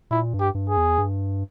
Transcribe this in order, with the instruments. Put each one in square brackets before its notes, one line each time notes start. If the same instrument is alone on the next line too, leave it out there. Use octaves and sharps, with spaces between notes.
[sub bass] A#2 [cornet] E4
[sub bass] G2
[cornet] G4
[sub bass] G2
[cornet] G#4
[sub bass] E2
G2